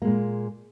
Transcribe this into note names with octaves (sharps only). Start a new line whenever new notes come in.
A#2 G#3 A#3